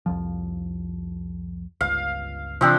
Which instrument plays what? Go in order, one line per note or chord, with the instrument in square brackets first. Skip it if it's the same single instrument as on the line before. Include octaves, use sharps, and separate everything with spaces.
[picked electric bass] C2 F2 F3
[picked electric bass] G1 C#2 [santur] F5
[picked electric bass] C3 E3 [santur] F3 C4 D4